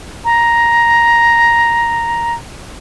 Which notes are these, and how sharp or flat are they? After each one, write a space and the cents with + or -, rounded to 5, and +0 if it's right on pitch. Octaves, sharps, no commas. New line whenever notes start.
A#5 +5